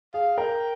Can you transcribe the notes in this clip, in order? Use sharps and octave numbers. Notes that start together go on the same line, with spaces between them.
G#4 F5
A#4 G5